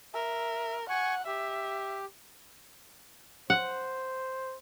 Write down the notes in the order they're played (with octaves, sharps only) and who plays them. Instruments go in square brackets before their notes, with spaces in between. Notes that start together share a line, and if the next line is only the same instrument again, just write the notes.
[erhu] A#4 [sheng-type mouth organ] E5
[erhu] F#5 [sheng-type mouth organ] G#5 C#6
[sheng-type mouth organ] G4 [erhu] E5
[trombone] C5 [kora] F#5